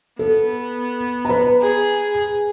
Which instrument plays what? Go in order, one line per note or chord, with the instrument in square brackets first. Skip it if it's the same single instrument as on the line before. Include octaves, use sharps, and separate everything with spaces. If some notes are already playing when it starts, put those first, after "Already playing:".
[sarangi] B3 [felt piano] A4
[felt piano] B4 A#5
[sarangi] G#4